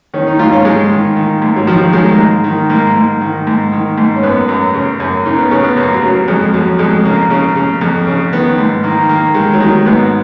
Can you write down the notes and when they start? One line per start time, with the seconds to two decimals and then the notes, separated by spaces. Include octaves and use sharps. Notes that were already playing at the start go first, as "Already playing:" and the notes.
0.14 D#3 C#4
0.27 D#4
0.39 G#2 F4
0.52 C#4
0.65 G#2 G#3
0.91 D#3
1.16 D#3
1.42 G#2
1.56 F#3
1.67 D#3 F3
1.80 F#3
1.93 D#3 G#3
2.06 A#3
2.18 G#2
2.44 D#3
2.70 G#2 A#3
2.96 G#2
3.21 D#3
3.47 G#2
3.72 D#3
3.98 G#2
4.16 C#4
4.23 F#2 B3
4.49 F#2
4.74 C#3
5.00 F#2
5.25 C#3 D#4
5.38 B3
5.51 C#3 C#4
5.64 B3
5.76 F#2 A#3
5.94 F#3
6.02 C#3
6.11 F#3
6.28 F2 G#3
6.53 F2 F#3
6.79 F2 G#3
7.05 C#3 A#3
7.30 C#3 A#3
7.56 C#3
7.81 F2
8.07 C#3
8.32 D#3 B3
8.58 G#2
8.84 D#3 A#3
9.09 D#3 A#3
9.34 D#3 G#3
9.53 F#3
9.60 D#3 G#3
9.86 G#2 B3